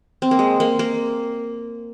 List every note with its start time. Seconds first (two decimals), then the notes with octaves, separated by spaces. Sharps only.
0.22 C4
0.31 A#3
0.39 G#3
0.60 A#3
0.79 A#3